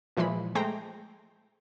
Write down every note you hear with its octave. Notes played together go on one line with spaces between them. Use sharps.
A#2 E3 F3 G#3 B5
G#3 A3 C5 G5 A#5